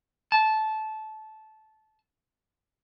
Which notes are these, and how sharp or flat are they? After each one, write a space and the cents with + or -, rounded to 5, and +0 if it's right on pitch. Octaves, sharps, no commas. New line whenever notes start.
A5 -15